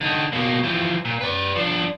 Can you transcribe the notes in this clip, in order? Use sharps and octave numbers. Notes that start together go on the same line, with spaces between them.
D3 D#4
B2 A#3
E3 F3
A#2
B4 D5
F3 D4